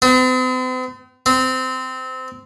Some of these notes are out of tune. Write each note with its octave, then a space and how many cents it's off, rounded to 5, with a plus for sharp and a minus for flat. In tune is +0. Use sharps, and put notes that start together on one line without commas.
C4 -45
C4 -20